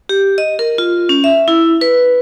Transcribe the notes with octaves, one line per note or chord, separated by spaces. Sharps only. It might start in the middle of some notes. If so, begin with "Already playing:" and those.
G4
D#5
A#4
F4
C#4
E5
E4
B4